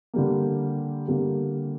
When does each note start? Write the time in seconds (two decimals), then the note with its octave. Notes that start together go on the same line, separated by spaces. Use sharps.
0.14 D3 G3 A#3
1.08 D3 G3 A#3